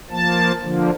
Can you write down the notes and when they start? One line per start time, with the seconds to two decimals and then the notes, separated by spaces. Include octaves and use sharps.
0.10 F3 A#3 A5
0.60 D3 F3 A#3